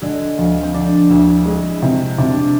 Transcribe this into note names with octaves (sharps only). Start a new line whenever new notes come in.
D3 G#3
D2 F3
C4
D3 D4
D2 E4
G#3
E4
C3
E4
C3 D4